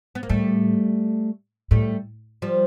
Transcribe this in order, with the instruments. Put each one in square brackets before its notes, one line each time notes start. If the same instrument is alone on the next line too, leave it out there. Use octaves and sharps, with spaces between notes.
[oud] B3
A#3
[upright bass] A2 [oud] G3 A3
[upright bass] A2 [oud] G3 A3
[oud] F3 G3